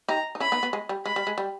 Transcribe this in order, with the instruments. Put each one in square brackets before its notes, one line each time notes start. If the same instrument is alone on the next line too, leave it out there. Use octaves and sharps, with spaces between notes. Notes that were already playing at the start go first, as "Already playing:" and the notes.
[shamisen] D#4 G4 [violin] A#5
[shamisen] D#4
[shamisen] C#4 E4 [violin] B5
[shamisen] B3 D#4
B3
G#3
G3
[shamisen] G#3 [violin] B5
[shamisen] G3
G#3
G3